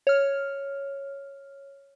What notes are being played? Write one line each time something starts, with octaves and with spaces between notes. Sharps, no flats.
C#5 F6